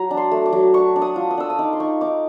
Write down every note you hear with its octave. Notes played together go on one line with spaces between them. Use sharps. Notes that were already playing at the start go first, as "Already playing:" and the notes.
Already playing: F#3 A#5
D4
C6
A3
D6
F#3
D4 C#6
D4
D#6
F4
D#6
D4 E6
D#6
D#4 D6
C6
D#4 C#6
D#4 D6